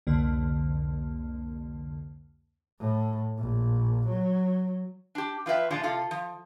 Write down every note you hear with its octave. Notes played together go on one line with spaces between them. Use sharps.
C2 F2 D3 A#3
A2
A#1
F#3
D4 G4
F3 F4 B4 E5 G5
A#2 F3 G#3 D4 F4
C3 F4 A4
F3